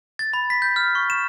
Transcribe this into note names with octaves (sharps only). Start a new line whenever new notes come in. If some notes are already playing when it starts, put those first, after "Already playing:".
A6
B5
B6
G6
F6
C#6
E7